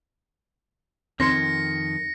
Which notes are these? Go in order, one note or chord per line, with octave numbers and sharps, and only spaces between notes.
F2 D#3 C4 C6 G#6 A#6 C#7